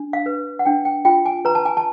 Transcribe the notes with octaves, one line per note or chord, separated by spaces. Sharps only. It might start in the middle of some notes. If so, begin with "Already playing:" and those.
Already playing: D4
F5
B4
F#5
D4 G5
G5
F4 G5
G#5
B4 A#5
A5
G#5
A5